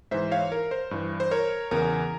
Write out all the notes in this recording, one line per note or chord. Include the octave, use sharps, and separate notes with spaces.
G#2 E3 C5 E5
C#5 F5
A#4
C5
G2 E3
C5
A#4 C#5
E2 C#3 E3 A#4